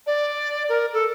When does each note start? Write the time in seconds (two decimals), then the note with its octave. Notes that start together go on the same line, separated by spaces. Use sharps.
0.06 D5
0.69 A#4
0.93 A4